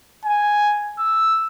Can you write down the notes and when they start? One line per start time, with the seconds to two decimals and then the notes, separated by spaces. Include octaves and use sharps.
0.25 G#5
0.99 E6